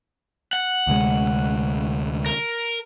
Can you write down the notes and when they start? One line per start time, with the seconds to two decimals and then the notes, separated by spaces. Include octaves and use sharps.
0.53 F#5
0.87 D2 C3 G#3
2.26 A#4